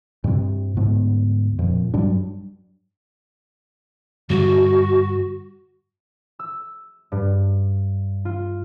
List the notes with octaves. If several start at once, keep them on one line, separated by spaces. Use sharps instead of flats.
G2 C3
D2 G#2 B3
F2 A#2
G2 F#3 G3 D4
G2 D3 G3 F#4
E6
G2
F4